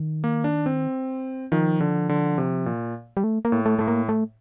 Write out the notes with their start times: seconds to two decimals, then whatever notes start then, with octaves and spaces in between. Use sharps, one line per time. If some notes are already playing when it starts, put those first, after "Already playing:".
Already playing: D#3
0.24 A#3
0.44 D4
0.66 C4
1.52 D#3 F3
1.80 D3
2.09 D3
2.38 C3
2.66 A#2
3.17 G3
3.24 A3
3.45 A#3
3.52 A2
3.66 A3
3.79 A2 A3
3.87 A#3
4.09 A3